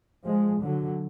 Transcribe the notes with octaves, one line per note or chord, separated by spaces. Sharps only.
F3 G#3
D3 F#3